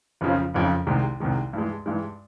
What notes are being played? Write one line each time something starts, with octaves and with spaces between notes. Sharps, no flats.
F#1 F2 C#3 F3
F#1 F2 C#3 F3
C2 C3 D#3 G#3
C2 C3 D#3 G#3
G2 E3 G#3
G2 E3 G#3